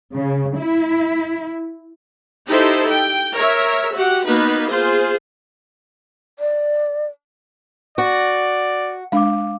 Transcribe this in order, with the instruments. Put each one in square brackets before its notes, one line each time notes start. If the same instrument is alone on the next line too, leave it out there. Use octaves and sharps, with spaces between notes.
[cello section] C#3
E4
[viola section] D#4 E4 G4 A4 C5
G5
A#4 C#5 E5
F#4 G4 F#5
A#3 B3 D#4 F#4 B4
F4 G#4 C5
[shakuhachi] D5
[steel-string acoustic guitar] F#4 [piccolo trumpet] D5
[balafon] G#3 D4 [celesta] F5 D6